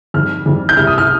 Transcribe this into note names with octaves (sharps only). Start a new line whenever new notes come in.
F2 D#3 G3 F6
F2 D#3 G3
G6
C2 C3 G3 F6
D#6
F6